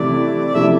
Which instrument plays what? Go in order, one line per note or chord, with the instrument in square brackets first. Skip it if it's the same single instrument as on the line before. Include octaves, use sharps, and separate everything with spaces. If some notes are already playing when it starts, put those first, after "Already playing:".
Already playing: [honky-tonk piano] C3 E3 A3 E4 [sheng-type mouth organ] D5
[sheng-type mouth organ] D5
[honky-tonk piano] C3 F3 A3 E4 [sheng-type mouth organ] E5